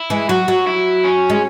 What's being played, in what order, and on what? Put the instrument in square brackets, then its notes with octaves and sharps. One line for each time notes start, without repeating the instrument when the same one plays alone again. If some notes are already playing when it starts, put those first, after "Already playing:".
Already playing: [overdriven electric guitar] E4
[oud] E3 G#3
[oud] F#3 [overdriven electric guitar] F#4
[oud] F#3
[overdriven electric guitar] E4
C#4
[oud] G#3